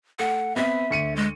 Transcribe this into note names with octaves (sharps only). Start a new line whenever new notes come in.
A3 F#5
B3 C4 E5
D2 C#7 D#7
G#3